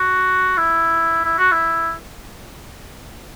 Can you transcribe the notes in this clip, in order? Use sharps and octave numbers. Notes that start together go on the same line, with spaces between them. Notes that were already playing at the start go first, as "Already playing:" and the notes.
Already playing: F#4
E4
E4
F#4
E4